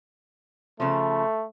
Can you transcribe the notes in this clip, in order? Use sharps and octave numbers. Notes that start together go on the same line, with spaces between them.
C#3 F3 A3